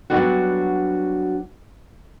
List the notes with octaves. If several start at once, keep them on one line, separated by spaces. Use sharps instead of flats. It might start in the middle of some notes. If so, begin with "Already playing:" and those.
F#3 G3 A3 B3 D4 F#4